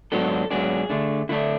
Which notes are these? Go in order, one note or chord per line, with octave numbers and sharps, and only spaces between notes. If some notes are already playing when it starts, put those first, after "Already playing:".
G#2 F#3 B3 D4 A4
G#2 F#3 B3 D4 G#4
D3 A3 D4
D3 A3 D4 E4